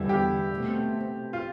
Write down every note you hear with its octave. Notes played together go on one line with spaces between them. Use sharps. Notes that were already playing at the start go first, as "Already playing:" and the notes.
Already playing: E2 D3 G3 E4
G4
B2 A3 C4
F4